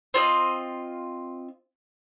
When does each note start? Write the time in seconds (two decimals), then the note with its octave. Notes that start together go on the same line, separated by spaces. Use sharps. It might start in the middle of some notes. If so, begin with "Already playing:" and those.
0.14 C4 F4 A#4 D#5